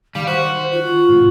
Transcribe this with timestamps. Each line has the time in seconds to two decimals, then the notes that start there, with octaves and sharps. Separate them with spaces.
0.15 D#3 G3 F5
0.27 F#4 C5
0.72 F4
1.09 G#2 C3